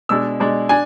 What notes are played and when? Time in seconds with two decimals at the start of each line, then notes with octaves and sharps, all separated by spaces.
0.09 B2 G#3 D4 E6
0.40 B2 G#3 D4
0.69 D4 G#5